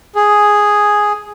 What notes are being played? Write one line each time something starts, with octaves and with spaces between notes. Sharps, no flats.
G#4